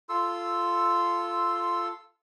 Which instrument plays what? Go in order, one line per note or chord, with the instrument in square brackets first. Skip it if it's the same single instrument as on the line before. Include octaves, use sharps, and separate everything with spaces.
[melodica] F4 A4 C6 E6